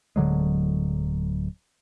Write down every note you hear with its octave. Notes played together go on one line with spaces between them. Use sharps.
D1 D3 F#3 G#3